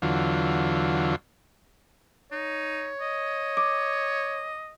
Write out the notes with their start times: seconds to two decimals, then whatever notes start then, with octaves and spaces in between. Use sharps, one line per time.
0.02 E2 D3 F#3 F4
2.32 D#4 C#5
3.01 D#5
3.57 D6